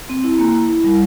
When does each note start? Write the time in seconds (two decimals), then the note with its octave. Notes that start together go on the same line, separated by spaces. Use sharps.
0.09 C4
0.24 E4
0.39 A#3
0.54 E4
0.69 E4
0.84 G3